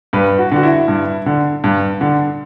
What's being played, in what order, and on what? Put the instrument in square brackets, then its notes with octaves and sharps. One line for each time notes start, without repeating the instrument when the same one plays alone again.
[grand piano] G2 B4
F#4
D3 F#4
E4
G2
D3
G2
D3